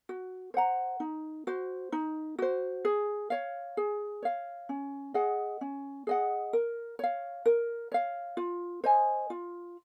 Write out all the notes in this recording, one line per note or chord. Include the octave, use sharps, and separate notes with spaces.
F#4
C5 F#5 A#5
D#4
F#4 C5
D#4
F#4 C5
G#4
C#5 F5
G#4
C#5 F5
C#4
G#4 D#5 F#5
C#4
G#4 D#5 F#5
A#4
C#5 F5
A#4
C#5 F5
F4
C5 D#5 G#5
F4